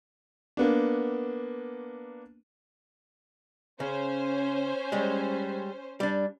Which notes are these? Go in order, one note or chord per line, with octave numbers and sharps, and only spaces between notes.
A#3 B3 D4
C#3 C#4 C5
G3 G#3
G3 D4